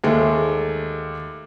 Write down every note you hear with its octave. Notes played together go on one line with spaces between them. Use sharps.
D#2 G#3 A3